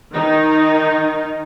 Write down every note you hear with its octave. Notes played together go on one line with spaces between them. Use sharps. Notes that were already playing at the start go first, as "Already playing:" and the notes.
D#3 D#4